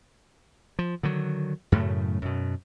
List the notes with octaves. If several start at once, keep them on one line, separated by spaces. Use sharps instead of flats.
F3
D3 D#3 F#3
F#2 A2 C#3 A3
F#2 B2